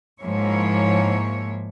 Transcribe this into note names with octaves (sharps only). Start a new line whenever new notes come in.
G#2 F3 A#3 E4 C#5